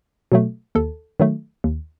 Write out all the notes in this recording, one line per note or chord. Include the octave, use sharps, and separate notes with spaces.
B2 F#3 A3
D#2 A4
D#3 F#3 A3
D#2